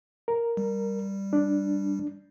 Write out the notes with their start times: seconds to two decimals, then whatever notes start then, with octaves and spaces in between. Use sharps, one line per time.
0.28 A#4
0.57 G3
1.33 D4